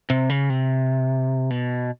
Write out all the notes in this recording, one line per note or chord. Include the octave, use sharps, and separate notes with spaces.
C3
C#3
C3
B2